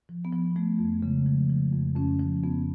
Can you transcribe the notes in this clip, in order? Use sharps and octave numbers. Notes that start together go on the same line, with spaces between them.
F3
B3
F3
F3 A3
F2
C#3 G#3
F3
F3
F2
F2 C#4
F3
F2 B3